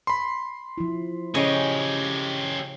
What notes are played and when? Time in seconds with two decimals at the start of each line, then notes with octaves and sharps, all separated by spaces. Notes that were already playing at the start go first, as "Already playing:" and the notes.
0.07 B5 C6
0.78 F3 E4
1.35 C#3 C#4 G4 D#5